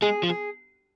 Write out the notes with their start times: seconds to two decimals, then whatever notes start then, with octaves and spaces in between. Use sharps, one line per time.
0.02 G#3 G#4
0.23 F3
0.30 G#4